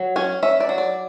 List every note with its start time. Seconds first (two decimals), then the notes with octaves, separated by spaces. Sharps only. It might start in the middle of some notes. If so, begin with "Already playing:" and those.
Already playing: F#3
0.16 C#4 G#5
0.43 C#4 E5
0.60 D5
0.69 F#3
0.78 D5